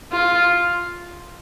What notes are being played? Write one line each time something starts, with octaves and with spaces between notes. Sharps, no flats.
F4